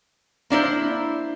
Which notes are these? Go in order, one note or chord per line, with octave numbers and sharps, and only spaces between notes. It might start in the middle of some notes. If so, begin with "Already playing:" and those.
A#3 D4 E4 C5